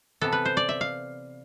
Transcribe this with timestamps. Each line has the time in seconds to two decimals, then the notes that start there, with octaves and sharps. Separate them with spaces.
0.21 C3 E3 B3 A4
0.32 B4
0.45 C5
0.57 D5
0.69 E5
0.81 F5